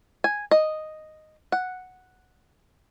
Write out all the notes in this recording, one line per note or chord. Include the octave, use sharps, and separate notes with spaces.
G#5
D#5
F#5